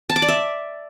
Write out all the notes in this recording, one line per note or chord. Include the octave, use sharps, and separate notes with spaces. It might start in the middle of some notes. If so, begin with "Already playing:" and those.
A5
D6
D5
E5